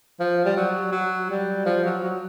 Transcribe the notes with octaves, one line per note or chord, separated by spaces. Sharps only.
F3
G3
F#3
F#3
G3
F3
F#3
F#3